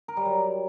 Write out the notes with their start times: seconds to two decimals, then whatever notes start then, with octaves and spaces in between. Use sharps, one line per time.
0.08 A#4
0.17 G3
0.25 F#3